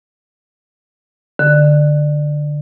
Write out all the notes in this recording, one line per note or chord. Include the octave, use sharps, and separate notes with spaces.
D3